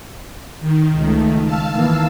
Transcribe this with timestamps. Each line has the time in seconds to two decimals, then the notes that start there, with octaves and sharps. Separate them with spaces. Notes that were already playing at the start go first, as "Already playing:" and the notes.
0.60 D#3
0.96 C#2 A3
1.44 F5 A5 E6
1.75 D#3 E3 A#3